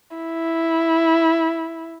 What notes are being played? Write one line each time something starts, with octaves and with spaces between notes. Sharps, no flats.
E4